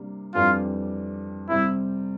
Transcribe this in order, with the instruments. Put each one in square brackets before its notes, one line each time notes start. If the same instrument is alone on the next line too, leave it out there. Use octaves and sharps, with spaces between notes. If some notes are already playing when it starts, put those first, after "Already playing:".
Already playing: [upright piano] C3 G3 A#3 D4
[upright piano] F2 E3 G3 D4 [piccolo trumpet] F4
[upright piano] C3 G3 C4 [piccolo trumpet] E4